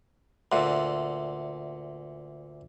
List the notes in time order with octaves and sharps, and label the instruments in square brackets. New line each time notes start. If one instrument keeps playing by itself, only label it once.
[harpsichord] D2 A#2 [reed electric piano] E5 F#5 C6